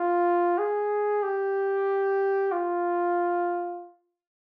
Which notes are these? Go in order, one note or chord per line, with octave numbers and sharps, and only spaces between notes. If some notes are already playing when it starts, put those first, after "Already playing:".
Already playing: F4
G#4
G4
F4